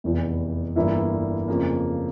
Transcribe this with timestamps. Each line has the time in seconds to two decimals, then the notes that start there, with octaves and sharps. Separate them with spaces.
0.04 F1 E2 E3
0.76 G1 G2 E3 A#3 E4
1.48 F2 C#3 F3 A#3